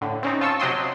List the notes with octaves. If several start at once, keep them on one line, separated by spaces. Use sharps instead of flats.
A2 D3
C4 C#4 D#4
F4 A5 C#6 E6
C3 F#3 D#5 G5 C6